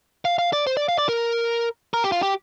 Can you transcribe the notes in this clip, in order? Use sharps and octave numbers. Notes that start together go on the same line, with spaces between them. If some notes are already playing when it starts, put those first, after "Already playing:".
F5
F5
D5
C5
D5
F5
D5
A#4
A#4
G4
F4
G4